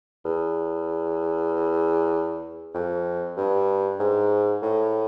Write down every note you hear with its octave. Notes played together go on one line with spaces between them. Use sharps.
E2
F2
G2
G#2
A2